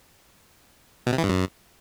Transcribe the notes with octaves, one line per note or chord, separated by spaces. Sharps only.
B2
C3
E3
G2
F#2